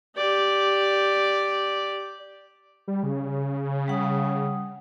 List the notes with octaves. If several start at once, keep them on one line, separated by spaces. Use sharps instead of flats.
G4 D5
G3
C#3
G3 F#5 D#6